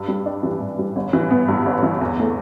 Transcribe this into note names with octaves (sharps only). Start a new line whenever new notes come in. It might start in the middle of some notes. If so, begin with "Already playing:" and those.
Already playing: G2
G3
D4
E3
G2
G3
G1
E3
B3
G2
G1
E3
E2
A3